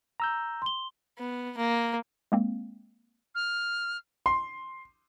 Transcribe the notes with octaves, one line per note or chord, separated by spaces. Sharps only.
A#5 E6 G6
C6 G7
B3
A#3
G#3 A#3 C4
F6
C6